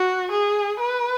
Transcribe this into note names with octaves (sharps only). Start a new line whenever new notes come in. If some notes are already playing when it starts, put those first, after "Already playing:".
Already playing: F#4
G#4
B4